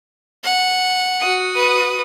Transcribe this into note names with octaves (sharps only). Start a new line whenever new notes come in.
F#5
F#4 D#6
B4